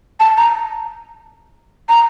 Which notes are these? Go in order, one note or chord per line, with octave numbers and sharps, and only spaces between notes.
A5
A#5
A#5